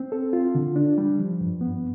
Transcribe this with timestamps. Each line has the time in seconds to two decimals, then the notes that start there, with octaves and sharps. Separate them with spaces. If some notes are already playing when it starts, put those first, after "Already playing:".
Already playing: C4
0.12 A4
0.33 F4
0.55 D3
0.76 D4
0.98 G3
1.19 F3
1.41 G2
1.61 B3